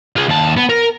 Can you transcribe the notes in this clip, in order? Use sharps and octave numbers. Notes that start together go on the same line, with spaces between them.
F4 G#4
D#2 A5
B3
A#4